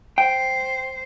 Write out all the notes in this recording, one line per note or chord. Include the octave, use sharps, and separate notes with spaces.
C5 G5